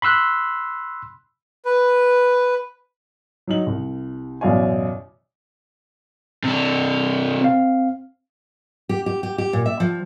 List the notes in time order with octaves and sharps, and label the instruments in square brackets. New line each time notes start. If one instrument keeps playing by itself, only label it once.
[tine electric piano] B5 C6 E6 F#6
[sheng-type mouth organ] B4
[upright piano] F#3 D#4 F#7
C2
A1 F#2 B2 D5 F5 G#5
[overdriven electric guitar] C3 D4
[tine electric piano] C4 F5
[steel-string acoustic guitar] G4
G4
G4
G4
A#2
E5
F3